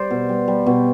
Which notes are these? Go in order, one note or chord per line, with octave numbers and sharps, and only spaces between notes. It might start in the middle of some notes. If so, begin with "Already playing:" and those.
Already playing: G3 C5 D5
B2
G3
G3
B2